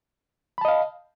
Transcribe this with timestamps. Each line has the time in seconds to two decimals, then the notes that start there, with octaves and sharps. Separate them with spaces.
0.58 B5
0.61 A5
0.65 D#5
0.68 F5